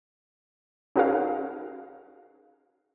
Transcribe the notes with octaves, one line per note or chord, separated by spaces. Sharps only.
C#4 D#4 F#4 G#4 A#4 F5